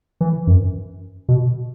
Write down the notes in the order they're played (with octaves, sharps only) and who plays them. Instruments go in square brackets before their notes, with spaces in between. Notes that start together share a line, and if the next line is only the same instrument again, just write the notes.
[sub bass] E3
F#2
B2